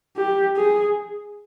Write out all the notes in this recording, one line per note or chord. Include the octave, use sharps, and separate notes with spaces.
G4
G#4